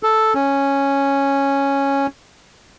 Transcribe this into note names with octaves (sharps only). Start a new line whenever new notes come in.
A4
C#4